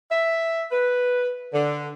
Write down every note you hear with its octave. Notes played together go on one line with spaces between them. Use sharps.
E5
B4
D3